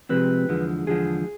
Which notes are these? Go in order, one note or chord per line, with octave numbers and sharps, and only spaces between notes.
C3 F3 G#3 C4 B4
E2 D3 F3 G#3
E2 D3 F3 G#3 G#4